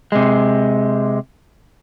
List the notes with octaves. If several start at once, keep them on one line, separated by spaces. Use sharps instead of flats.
C3 G#3